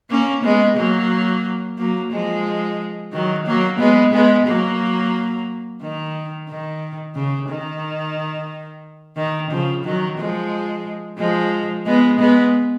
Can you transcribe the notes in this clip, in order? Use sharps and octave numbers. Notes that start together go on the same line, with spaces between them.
A#3 C#4
G#3 B3
F#3 A#3
F#3 A#3
F3 G#3
D#3 F#3
F#3 A#3
G#3 B3
G#3 B3
F#3 A#3
D#3
D#3
C#3
D#3
D#3
C#3 F3
D#3 F#3
F3 G#3
F3 G#3
G#3 B3
G#3 B3